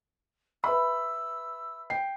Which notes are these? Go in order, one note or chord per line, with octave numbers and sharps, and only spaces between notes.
B4 E5 B5 E6
G5 C7